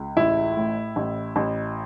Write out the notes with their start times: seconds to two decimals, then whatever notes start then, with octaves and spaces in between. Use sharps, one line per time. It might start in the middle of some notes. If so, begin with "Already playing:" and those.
Already playing: C#2
0.17 A1 E4
0.57 A2
0.96 A1
1.36 A1